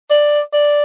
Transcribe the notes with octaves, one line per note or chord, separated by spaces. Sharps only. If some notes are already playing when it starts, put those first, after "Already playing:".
D5
D5